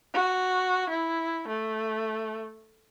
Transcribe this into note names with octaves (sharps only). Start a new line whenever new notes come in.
F#4
E4
A3